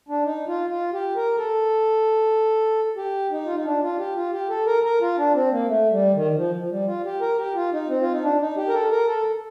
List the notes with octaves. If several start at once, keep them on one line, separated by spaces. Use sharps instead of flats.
D4
D#4
F4
F4
G4
A#4
A4
G4
D#4
F4
D#4
D4
F4
G4
F4
G4
A4
A#4
A#4
F4
D4
C4
A#3
A3
G3
D#3
D#3
F3
F3
G3
F4
G4
A#4
G4
F4
D#4
C4
F4
D#4
D4
D#4
G4
A#4
A4
A#4
A4